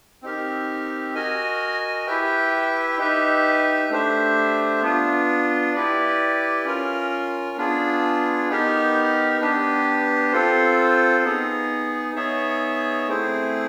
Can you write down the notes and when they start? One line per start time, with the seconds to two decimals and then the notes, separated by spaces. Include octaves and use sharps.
0.22 C4 D#4 G4 A#4
1.15 F#4 A#4 D#5 G#5
2.07 E4 G4 B4 E5 G5
2.98 D#4 G4 B4 E5
3.90 A3 D4 G4 C5 E5
4.82 B3 D4 F4
5.73 E4 G4 B4 D5
6.65 C#4 F4 A#4
7.57 B3 D4 F4 G#4
8.49 B3 D#4 G4 A#4
9.40 B3 D4 G4 B4
10.32 C4 F4 A4 C5
11.24 B3 D#4 G#4
12.15 B3 D#4 G#4 C#5 E5
13.07 A3 C4 E4 G#4 C5